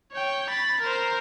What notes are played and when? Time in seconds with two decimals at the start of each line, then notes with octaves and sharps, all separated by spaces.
0.12 C#5 G5
0.50 B5 A6
0.81 A#4 C5